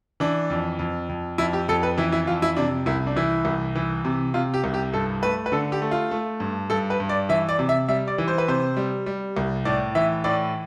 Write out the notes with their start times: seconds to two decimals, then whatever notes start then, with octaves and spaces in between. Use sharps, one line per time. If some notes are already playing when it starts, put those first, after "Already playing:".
0.20 E3 D4
0.50 F2
0.79 F2
1.09 F2
1.38 F2 E4
1.53 G4
1.68 F2 A4
1.83 B4
1.98 E3 E4
2.12 E4
2.27 F2 F4
2.42 E4
2.57 C3 D4
2.86 C2 E4
3.07 D4
3.16 E3 E4
3.45 C2
3.75 E3
4.05 C3
4.34 C3 F4
4.54 G4
4.64 C2
4.74 G4
4.93 G2 A4
5.22 A3 B4
5.46 B4
5.52 D3 A4
5.72 G4
5.82 A3
5.91 F4
6.11 A3
6.40 G2
6.70 G2 A4
6.90 B4
7.00 G2
7.09 D5
7.29 E3 E5
7.49 D5
7.59 C3
7.69 E5
7.88 G3 E5
8.08 D5
8.18 E3
8.28 C5
8.38 B4
8.48 C3 C5
8.77 G3
9.06 G3
9.37 C2
9.65 A2 D5
9.95 E3 E5
10.24 A2 D5